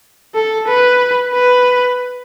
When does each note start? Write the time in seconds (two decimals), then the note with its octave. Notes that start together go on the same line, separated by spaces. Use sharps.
0.35 A4
0.68 B4
1.33 B4